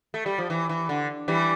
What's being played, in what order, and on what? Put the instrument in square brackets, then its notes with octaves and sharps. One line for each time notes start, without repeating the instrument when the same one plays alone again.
[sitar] A3
G3
F3
E3
E3
D3
E3 G3